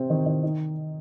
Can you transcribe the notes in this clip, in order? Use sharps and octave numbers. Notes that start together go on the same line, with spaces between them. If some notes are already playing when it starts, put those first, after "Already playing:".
Already playing: C3 C4
D#3
D#3
D#4